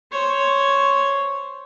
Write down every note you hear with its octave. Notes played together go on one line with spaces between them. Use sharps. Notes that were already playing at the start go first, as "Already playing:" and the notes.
C5 C#5